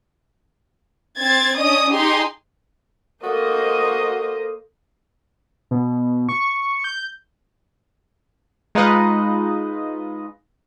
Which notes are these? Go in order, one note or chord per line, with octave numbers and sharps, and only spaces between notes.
C4 G#6 A6
C#4 D4 D#5 D#6
D#4 G4 G#4 C6
A#3 F#4 A4 C5 D#5
B2
C#6
G6
G#3 D#4 F4 B4 D#5